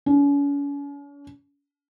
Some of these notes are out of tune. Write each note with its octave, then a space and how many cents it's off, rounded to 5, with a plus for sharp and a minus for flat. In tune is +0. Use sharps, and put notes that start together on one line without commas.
C#4 +40